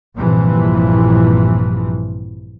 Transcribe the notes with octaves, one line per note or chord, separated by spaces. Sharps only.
A#1 G2 C3 E3 F3